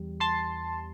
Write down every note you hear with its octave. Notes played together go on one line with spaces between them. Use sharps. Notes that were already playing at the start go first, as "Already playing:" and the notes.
Already playing: E2 G3
A5 C6